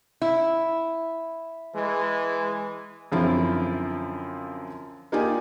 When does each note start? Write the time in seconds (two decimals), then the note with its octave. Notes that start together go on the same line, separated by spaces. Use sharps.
0.21 E4
1.75 E3 G#3
3.12 F#2 D3 F3 C4 E4 F4
5.12 A#3 D#4 F4 G4 D5 G#5